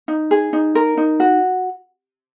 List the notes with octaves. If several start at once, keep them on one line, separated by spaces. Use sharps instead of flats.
D#4
G#4
D#4
A#4
D#4
F#4